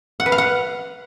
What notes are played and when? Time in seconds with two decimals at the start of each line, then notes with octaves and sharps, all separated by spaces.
0.20 F#5
0.26 B4
0.32 F5
0.38 F#5